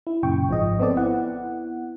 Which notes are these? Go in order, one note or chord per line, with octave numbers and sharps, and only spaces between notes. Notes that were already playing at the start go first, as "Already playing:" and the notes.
E4
F#2 A#2 C#3 G5 C#6
G#1 G#2 F3 G#3 D#5
B3 C4 A4 D5
B3 E4 F#5